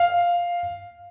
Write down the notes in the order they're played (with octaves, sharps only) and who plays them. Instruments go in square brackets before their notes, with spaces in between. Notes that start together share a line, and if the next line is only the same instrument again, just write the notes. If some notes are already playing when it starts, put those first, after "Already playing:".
Already playing: [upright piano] F5